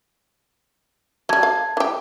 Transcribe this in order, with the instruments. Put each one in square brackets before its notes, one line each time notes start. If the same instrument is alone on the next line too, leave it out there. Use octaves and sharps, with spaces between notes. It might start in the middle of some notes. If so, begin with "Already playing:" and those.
[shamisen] F#3 G3 [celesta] A5 G#6
[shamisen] F5
E3 G4